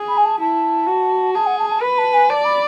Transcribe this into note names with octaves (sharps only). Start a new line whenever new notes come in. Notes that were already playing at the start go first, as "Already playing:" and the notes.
Already playing: G#4
B5
G#5
A5
E4 A5
F#4
G#4 A5
F#5
A5
A5
B4 B5
A5
G#5
D5 A5
B5